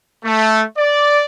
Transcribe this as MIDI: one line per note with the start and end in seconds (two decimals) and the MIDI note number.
0.24 0.62 57
0.77 1.23 74